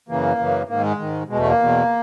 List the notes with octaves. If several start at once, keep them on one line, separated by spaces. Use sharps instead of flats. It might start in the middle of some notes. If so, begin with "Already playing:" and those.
F#2 C#3 E3 A#3
F#2 C#3 E3
G#2 D#3 A#3
G#3
G#2 D#3
E2 B2 G#3
A3
A#3
E2 B2